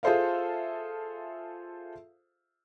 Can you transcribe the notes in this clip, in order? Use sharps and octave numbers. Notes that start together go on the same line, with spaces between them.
F4 G#4 A4 C5 E5 F5